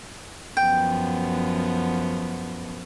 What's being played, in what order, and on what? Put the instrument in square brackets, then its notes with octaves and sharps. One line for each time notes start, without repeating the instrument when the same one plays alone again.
[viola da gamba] F#2 F3 B3 [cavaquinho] G5